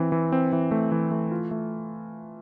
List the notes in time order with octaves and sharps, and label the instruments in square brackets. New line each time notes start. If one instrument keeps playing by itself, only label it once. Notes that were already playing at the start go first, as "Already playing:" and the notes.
Already playing: [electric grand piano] E3 C4
E3
C4
E3
A3
E3
A3
F4
A3